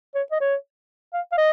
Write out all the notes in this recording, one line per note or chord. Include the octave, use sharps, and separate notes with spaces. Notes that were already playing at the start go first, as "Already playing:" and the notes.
C#5
D#5
C#5
F5
F5
D#5